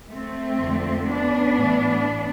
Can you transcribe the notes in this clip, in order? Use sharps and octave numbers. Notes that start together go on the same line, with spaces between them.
A3 C4
F2 D3 F3
B3 D4
A2 E3